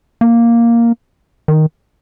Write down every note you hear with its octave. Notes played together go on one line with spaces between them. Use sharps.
A#3
D#3